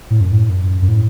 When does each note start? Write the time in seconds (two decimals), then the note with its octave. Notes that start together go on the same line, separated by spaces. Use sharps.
0.10 A2
0.21 F#2
0.32 A2
0.49 F#2
0.82 F#2
0.88 A2